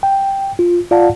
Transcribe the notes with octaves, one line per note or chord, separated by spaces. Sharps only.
G5
F4
F4 D5 F5 F#5 A5